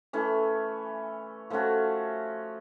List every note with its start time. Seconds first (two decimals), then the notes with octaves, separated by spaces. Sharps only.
0.13 E3 A3 C#4
1.50 F3 A3 C#4 F#4